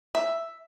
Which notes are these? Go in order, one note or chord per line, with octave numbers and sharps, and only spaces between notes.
E5